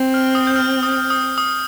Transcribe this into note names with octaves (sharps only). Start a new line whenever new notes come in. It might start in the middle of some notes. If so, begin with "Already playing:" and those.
Already playing: C4
F6
D#6
G6
F6
D#6
D#6
D#6